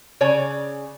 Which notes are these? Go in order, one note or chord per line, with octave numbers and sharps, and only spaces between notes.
C#3 C#5 D5 G#5